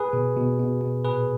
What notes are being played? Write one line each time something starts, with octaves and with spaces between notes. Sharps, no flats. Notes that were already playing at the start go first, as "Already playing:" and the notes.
Already playing: G#4 B4
B2
B2
B2
B2
A#2 G#4 B4